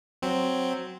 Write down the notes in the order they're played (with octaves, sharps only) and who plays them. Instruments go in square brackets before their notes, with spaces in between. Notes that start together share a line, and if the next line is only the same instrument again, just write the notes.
[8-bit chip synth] F#3 C4